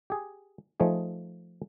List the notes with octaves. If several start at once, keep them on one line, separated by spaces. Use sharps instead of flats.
G4 G#4
F3 A3 D#4 G#4